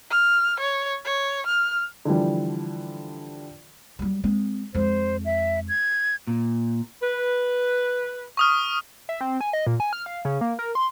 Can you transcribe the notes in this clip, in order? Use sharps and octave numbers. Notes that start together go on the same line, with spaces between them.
F6
C#5
C#5
F6
D3 E3 F3 G3
F#3 G3
G#3 C4
F2 G#3 C5
E5
G#6
A#2
B4
C#6 D#6 F6
E5
C4
G#5
D#5
A#2
G#5
F6
F5
C#3
A#3
A#4
C6